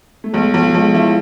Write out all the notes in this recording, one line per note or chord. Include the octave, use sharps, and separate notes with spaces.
A3
B1 G#3
B1 F3
F3
B1 G#3
F3 E4